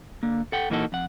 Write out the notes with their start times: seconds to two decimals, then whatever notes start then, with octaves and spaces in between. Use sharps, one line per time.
0.23 D3 A#3
0.52 A4 F#5 G5
0.70 A#2 E3 A#3 D#4 F#4 A4
0.92 F2 F#5